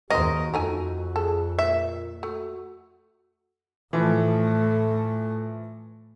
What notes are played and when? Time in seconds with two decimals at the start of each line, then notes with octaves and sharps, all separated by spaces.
0.10 D#2 C#3 F#4 A#4 C5 D#5
0.54 F2 A3 D#4 G#5
1.16 G#4 A4
1.59 A#2 E5
2.23 A3 F#4
3.93 A2 E3 F3 A3